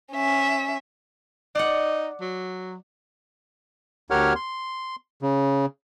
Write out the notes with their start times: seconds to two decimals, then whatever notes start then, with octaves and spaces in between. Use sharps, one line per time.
0.14 C#4 E5
1.55 D#4 D5 F#5
2.21 F#3
4.10 D2 G4 A#4 C#5 F#5 F6
4.35 C6
5.22 C#3